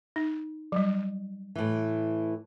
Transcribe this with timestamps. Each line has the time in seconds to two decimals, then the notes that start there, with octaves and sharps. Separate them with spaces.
0.16 D#4
0.72 F#3 G3
1.55 A2 E3